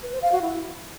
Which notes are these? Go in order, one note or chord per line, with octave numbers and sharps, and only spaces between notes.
B4
C5
F5
F#4
E4